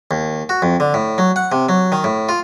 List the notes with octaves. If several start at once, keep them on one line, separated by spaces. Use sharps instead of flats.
D#2
F#4
F2
D3
A2
F#3
F#5
C3
F#3
D#3
A2
F4